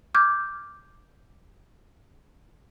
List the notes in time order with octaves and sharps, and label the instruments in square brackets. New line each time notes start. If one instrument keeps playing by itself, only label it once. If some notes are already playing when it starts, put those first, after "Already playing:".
[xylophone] D6 F6 G6 G#6